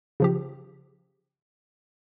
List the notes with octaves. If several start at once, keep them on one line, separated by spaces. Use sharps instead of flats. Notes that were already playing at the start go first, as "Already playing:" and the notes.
C#3 F3 G4